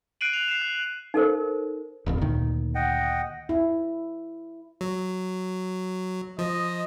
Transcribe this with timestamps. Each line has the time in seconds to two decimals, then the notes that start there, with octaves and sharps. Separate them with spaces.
0.21 F#6 C7 D7 D#7 F#7
0.33 F7
0.48 C7 E7
0.62 F#6
1.14 D#4 A4 A#4 C5
2.06 D#1 A#1 F2
2.22 D2 A#2 D#3
2.75 D#5 F#5 G5
3.49 E4
4.81 F#3
6.39 F3 D#5